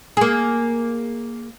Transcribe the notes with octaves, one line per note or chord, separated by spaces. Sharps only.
A#3 G#4